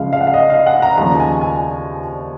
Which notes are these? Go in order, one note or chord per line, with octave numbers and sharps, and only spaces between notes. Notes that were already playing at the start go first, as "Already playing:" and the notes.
Already playing: C#2 C#3 F3 G#3 F5
F5
F#5
F5
D#5
F5
F#5
A#5
D#2 C#3 F3 G#3 A#5
G#5
G#5